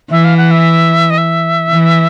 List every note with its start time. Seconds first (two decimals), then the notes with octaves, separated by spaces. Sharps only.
0.11 E3 E5
0.24 F5
0.37 F#5
0.51 E5
1.10 D#5
1.18 E5
1.70 E3